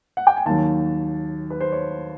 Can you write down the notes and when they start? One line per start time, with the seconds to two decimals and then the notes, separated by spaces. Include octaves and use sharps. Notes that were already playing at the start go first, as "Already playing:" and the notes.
0.17 F#5
0.27 G5
0.36 G#5
0.46 D#2 D#3 F#3 A5
1.50 B4
1.61 C5
1.72 C#5